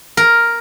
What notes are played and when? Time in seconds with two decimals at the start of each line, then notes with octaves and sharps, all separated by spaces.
0.17 A#4